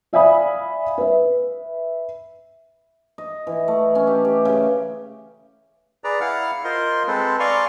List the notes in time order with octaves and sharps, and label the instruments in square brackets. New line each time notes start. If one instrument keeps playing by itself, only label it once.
[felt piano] D5 E5 F5 G#5 B5 D#6
B4 E5
[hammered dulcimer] D#5
E3
A3
C#4
G4
G4
C#3
[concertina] G#4 B4 D5 A#5
E4 F5 F#5 F6
F4 A#4 C5 D#5 C6
G#3 C4 A4 B4 C5
D5 F5 G#5 A#5 C6 C#6